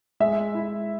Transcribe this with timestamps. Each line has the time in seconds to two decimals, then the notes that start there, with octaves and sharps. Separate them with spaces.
0.20 G#3 E5
0.55 E4